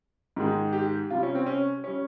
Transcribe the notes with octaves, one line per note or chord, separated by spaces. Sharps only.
G#2 D#3 G#3
G4
C3 G3 F4
C#4
C4
C#4
G3 C#4